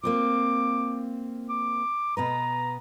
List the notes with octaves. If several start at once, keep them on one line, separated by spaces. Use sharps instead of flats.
A#3 C4 F4 D6
D6
B2 B3 B4 A#5